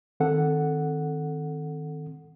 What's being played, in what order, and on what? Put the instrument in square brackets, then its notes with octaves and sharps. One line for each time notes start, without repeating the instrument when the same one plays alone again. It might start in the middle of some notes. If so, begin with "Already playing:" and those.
[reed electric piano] D#3 C4 A4 F#5